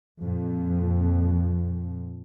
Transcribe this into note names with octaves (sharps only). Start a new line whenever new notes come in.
F2 A#2